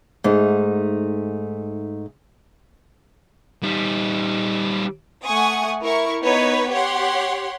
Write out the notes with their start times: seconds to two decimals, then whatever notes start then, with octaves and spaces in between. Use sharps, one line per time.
0.24 G#2 A3 D#4
3.63 G3 D#4
5.25 A3 F#5 G#5 C#6 D#6
5.83 E4 A#4 C#6
6.22 B3 D#4 B4 C#5
6.70 G4 C#5 F#5 C6